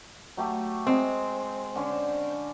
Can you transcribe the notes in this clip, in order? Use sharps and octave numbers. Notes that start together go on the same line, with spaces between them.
F#3 A3 G4
G#3 C4
D3 C#4